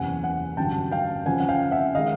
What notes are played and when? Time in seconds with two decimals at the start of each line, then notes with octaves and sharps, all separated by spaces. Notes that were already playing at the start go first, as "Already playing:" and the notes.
Already playing: F#1 E2 C3 F#5 G#5
0.23 F#5 G#5
0.57 A1 G2 D3 F#3 G5 A5
0.91 F5 G5
1.26 F2 C#3 F3 F#5 G#5
1.40 F#5
1.49 F5 G5
1.71 E5 F#5
1.95 D#3 G#3 D#5 F5